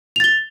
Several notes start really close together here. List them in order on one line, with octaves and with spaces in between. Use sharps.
F7 A6 G7